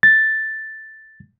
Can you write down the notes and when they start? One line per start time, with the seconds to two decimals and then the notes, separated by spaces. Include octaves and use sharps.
0.03 A6